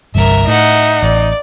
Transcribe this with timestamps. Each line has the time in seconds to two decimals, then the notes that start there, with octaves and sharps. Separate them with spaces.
0.15 G1 C2 G2 A#4 E5
0.47 A2 D#4 E5 F#5
1.02 A1 D5